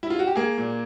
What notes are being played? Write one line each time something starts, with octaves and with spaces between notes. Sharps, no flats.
E4
F4
F#4
G4
A#3 G#4
A#2